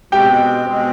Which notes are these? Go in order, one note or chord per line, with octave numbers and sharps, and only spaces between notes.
B2 G#3 C4 G4 G5
B2 G#3 C4